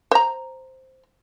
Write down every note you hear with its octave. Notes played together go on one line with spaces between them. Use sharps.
C5 A#5